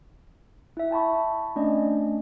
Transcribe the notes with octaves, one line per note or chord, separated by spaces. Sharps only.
E4 E5
G5 A5 B5 C#6
A3 C#4 D4 D5 D#5